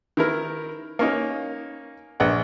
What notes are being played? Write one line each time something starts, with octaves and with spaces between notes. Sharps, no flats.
D#3 E4 A#4
A#3 C#4 D#4
A#1 F#5